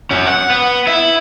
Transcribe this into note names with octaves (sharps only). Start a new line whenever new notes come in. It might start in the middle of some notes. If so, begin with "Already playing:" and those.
C#4 F#4
F#5
B3
E4 E5